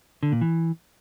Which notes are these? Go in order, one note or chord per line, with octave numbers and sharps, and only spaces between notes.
D3
A#2
E3